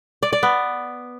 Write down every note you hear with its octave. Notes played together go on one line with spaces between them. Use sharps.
D5
D5
B3